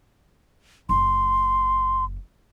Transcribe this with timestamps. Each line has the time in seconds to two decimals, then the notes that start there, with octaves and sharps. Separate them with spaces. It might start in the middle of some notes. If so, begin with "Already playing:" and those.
0.89 F#1 C6